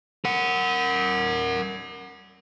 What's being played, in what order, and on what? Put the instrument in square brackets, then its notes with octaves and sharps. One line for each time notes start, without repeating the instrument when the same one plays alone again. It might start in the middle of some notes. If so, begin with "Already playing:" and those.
[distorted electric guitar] A#4 F#5